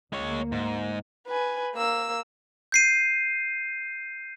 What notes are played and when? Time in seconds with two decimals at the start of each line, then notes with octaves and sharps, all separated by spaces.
0.13 D2 G#3 A#3 C#5
0.52 G#2
1.27 B4 G#5
1.75 A#3 E6
2.72 G6 C7 D#7